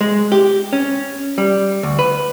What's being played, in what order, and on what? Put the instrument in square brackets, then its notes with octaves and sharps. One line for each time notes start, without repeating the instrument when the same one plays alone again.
[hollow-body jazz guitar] G#3
G4
C#4
G3
D2
B4